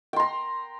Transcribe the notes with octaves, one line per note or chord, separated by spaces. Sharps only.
G5 A#5 C6